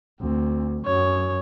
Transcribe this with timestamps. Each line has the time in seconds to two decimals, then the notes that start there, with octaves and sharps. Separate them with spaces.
0.21 D2 C4
0.86 F#2 C#5